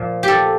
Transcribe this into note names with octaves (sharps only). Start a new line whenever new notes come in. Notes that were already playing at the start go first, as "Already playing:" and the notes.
Already playing: A#2 F3
G4 A4